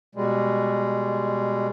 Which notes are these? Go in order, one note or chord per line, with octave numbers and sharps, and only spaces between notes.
B2 G3 G#3